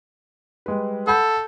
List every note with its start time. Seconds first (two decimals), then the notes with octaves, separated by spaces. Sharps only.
0.66 G3 G#3 B4
1.07 A4 F#5 B5 G6